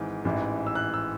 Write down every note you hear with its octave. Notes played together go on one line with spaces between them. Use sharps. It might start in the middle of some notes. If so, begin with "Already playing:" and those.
Already playing: G#1 G#2 E3
A1 G#2 E3
E6
F#6
E6